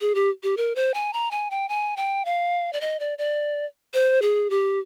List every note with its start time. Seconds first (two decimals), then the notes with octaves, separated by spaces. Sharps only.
0.01 G#4
0.15 G4
0.43 G4
0.57 A#4
0.76 C5
0.94 G#5
1.13 A#5
1.31 G#5
1.51 G5
1.69 G#5
1.97 G5
2.25 F5
2.73 D5
2.81 D#5
3.00 D5
3.18 D5
3.94 C5
4.22 G#4
4.50 G4